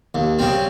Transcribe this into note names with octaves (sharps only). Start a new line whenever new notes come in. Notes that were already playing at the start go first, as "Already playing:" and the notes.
D#2
C#3 G3 C4